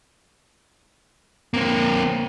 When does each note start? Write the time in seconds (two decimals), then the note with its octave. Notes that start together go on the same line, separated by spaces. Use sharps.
1.54 A#3 C4